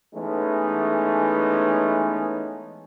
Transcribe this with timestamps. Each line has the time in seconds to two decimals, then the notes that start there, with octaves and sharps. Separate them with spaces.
0.15 E3 G#3 A3 B3 C#4 D#4